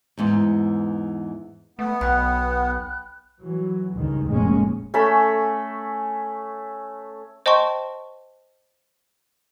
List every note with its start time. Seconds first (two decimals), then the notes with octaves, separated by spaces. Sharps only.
0.18 E2 G#2 E3
1.79 A3 B3
2.01 B1 G5 B5 F#6
3.41 E3 F#3
3.95 C#2 G2 D#3
4.27 F1 A#1 G#3 A#3 C#4
4.94 A3 C#4 A4 B5
7.46 C5 D#5 G5 A5 C6 C#6